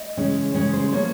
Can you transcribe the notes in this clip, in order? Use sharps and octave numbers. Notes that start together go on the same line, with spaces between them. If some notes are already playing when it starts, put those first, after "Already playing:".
Already playing: D#5
C#3 E3 G#3 C#4
C#3 E3 G#3 C#4 C#5
C5
F3 A#3 C#4 C#5